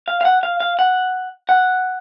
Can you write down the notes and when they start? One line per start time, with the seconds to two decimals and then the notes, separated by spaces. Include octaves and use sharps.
0.08 F5
0.21 F5
0.25 F#5
0.43 F5
0.60 F5
0.79 F#5
1.49 F#5